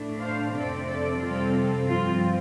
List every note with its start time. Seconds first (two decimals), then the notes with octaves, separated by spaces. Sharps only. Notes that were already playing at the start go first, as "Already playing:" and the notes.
Already playing: A2 A3 D4
0.19 C5 F5
0.53 F2 C3 A3 C4 A4 D5
0.87 A4 D5
1.21 C3 G3 C4 F4 A4
1.87 G2 F3 C4 F4